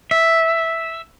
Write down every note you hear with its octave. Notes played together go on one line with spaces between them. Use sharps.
E5